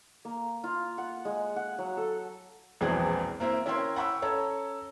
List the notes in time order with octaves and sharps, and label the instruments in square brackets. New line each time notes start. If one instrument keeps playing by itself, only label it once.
[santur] A#3
F4
F#5
G#3
F#5
F#3
A4
[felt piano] E1 A#1 E2 E3 C4 G#4
A#3 C4 E4 C5
C#4 E4 A#4 E5 G5 C6
F#5 G5 B5 C#6 E6
C#4 A4 C#5 A#5